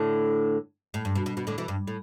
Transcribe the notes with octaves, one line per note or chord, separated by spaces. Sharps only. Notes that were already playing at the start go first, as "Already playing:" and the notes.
Already playing: A2 D3
A2
G2
B2
B2
B2
A2 D3
B2 E3
G2
A2